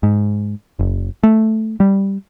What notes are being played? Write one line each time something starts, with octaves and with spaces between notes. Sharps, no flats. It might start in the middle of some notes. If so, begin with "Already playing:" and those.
G#2
F#1
A3
G3